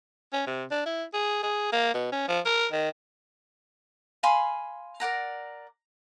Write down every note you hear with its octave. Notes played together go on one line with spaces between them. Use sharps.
C#4
C3
D4
E4
G#4
G#4
A#3
B2
C#4
F3
A#4
D#3
F5 G#5 B5 C6
A#4 D5 F#5 A#5